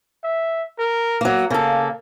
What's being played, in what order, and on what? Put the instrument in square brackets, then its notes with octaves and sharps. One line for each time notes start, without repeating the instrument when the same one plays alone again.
[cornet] E5
A#4
[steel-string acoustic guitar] F#3 A#3
[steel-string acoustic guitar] C#3 A4 [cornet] A#3